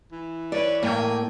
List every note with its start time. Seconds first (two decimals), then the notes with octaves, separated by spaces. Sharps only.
0.12 E3
0.52 B4 C#5 D5
0.83 A2 A#3 G5 G#5